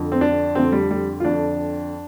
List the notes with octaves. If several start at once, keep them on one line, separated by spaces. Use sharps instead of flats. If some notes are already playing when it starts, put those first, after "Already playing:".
Already playing: F2 D3
C4
D4
F2 D3 C4
G3
G3
F4
F2 D3 D4